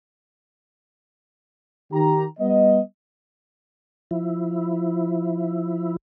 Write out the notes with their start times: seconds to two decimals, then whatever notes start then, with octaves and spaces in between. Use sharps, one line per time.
1.92 D#3 G4 A#5
2.40 G3 B3 D#5
4.11 F3 E4